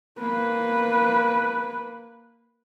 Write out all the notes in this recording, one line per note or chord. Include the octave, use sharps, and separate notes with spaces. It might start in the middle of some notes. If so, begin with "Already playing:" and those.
A#3 B4